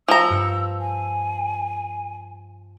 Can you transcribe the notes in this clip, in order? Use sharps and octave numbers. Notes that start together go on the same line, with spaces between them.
F3 A#5 E6
G2 F6 C#7
G#5